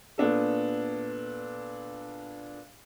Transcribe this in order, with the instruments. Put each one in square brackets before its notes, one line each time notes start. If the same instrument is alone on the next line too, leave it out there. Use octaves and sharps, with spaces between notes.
[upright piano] A#2 B3 D4 A4